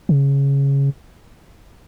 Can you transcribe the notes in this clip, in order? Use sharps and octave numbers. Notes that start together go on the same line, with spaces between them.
C#3